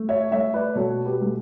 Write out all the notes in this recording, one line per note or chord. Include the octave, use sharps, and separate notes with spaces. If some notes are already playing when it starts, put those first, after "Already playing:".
Already playing: A3
C#5 E5
A3 C#5 E5
B4 D5
B2 A4 C#5
G4 B4
A3